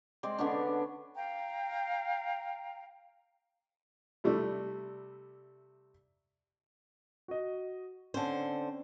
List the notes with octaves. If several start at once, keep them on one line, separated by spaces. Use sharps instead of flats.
G#3 C4 D5
D3 B3 C#4 D4
F5 G5 A#5
C3 G3 A3 D4 E4
F#4 D#5
D3 C4 C#4 C5